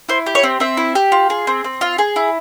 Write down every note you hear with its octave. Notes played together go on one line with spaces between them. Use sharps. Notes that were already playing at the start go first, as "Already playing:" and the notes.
E4 C5
G4
C#5
C4
C4 E5
E4
G4
F4
G#4
C4
C4
F4
G#4
E4